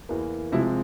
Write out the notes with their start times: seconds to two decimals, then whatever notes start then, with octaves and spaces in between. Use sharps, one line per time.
0.09 E2 E3 A#3
0.52 C3 F3 G#3 E4